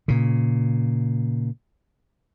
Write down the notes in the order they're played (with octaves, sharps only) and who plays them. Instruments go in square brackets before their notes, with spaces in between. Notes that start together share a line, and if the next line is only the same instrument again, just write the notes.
[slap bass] A#2 C#3